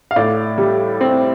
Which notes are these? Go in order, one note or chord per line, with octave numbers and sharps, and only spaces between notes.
F5
A2 D5
G3
C4